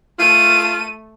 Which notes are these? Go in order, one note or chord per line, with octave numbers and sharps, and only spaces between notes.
A3 F4 D#7